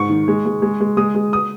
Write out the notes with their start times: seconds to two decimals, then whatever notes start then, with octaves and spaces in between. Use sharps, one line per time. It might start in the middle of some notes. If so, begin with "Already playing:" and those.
Already playing: G#2 C#6
0.09 D#3
0.28 G#3
0.45 G#3
0.62 G#3
0.80 G#3
0.97 G#3 D#6
1.15 G#3
1.33 D#6